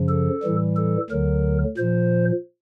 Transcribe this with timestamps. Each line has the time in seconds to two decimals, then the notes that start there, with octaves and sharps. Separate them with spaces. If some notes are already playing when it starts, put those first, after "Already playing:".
Already playing: F#2 C#3 F3
0.09 A4
0.43 A2 E3 G3
0.76 A4
1.10 D2 D3 F#3 A#4
1.77 A#2 F3 C5